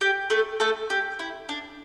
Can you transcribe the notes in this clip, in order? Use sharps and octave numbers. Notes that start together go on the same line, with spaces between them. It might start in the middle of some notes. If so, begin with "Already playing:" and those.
G4
A3 A4
A3 A4
G4
E4
D4